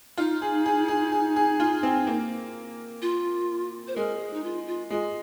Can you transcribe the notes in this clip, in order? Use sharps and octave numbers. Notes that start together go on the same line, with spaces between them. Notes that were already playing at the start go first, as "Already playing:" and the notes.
D#4 F4
G#4
G#4
G#4
G#4
G#4
F4
C4
A#3
F4
C5
G#3 A#4
G#4
D#4
F4
F4
G#3 F4